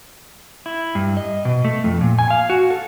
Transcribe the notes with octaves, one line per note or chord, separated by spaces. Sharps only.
E4
G2
D#5
B2
A3
F2
A#2
G#5
F5
F#4
A4